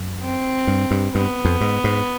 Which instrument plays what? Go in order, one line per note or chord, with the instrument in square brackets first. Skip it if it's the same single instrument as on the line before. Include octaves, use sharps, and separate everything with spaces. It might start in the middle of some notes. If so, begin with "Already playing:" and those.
Already playing: [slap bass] F#2
[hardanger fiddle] C4
[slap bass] G2
G2
[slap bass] G2 [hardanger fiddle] B3
[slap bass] F2
G#2
G#2